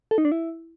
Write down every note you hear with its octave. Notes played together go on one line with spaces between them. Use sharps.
A4
D#4
D4
E4